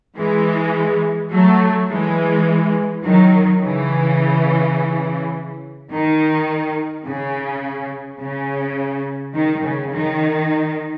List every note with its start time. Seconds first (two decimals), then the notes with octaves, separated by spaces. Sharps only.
0.18 E3 G#3
1.32 F#3 A3
1.90 E3 G#3
3.04 D#3 F#3
3.61 C#3 E3
5.91 D#3
7.05 C#3
8.20 C#3
9.35 D#3
9.64 C#3
9.92 D#3